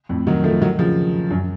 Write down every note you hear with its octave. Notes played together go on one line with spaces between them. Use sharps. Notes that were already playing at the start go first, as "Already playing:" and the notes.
F2 A2
D#3 F#3
F3 A3
D#3 F#3
C#3 F3
F#2